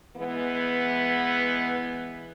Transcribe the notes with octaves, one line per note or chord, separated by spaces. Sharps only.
E3 G#3 B3